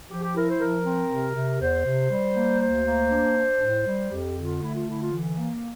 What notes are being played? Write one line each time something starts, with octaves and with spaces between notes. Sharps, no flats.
F3 G4
G4
E4 A#4
C5
F3 A#4
C4
C3
C3
E2 C5
C3
G3
A#3
D2 C5
A#3
D4
D4
A2
G3
F2 G4
D3 F4
A3 E4
F4
D3 E4
F4
E3
A#3